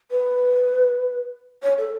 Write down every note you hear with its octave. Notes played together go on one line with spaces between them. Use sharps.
B4
C#5
A4